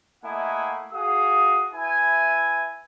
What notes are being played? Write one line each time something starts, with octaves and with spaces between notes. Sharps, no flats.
A3 A#3 E4 D#5 F#5 G#5
F#4 G#4 F5 D#6
E4 B4 E5 G#5